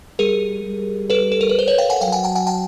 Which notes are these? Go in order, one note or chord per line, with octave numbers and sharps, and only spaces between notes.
G3 G#4 A#4
G3
A4 B4
A4
A#4
B4
C5
B4 C#5
F5 G5
F#5 G#5
F#3 F5 G5
F#5 G#5
G5 A5
F#5 G#5
G5 A5